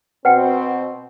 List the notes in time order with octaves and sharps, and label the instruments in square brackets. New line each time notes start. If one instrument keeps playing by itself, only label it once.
[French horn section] B2 C4 [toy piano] B4 F#5 G5